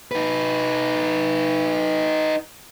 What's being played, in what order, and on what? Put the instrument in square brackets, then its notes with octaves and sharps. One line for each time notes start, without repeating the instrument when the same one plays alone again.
[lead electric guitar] D#4 B4